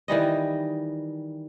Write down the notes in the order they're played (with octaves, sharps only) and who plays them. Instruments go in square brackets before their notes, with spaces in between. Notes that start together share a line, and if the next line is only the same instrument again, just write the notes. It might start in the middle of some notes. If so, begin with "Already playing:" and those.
[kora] D#3 E3 G3 D#5